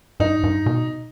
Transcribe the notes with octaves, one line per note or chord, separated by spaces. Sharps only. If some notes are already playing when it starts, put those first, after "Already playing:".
G2 D#4
G2
B2